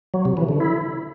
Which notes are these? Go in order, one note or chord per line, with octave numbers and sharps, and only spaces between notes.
F#3
C3
E3
D3
E4